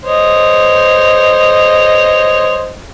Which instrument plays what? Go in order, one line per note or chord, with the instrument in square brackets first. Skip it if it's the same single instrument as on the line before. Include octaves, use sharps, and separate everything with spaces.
[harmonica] C5 C#5 D#5